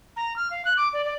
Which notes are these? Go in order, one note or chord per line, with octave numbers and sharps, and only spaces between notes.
A#5
F6
F5
F#6
D6
D5
D5